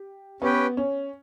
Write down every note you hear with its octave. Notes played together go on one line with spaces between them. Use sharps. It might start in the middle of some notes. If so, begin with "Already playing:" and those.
Already playing: G4
B3 C#4 G4 B4 G5
C#4